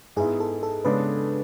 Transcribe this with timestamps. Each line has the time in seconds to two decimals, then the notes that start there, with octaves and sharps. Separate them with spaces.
0.16 G#2 G#3 B3 E4 G#4
0.40 A4
0.63 A4
0.85 C#3 G#3 B3 D4 B4